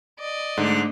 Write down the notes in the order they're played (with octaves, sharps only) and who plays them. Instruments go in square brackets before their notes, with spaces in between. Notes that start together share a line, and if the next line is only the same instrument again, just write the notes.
[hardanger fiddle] D5 D#5
[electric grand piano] G#2 [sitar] D3 [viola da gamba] A3